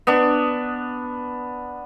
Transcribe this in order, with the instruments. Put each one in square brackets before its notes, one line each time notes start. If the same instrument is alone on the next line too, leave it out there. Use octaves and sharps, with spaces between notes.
[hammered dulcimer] B3 D4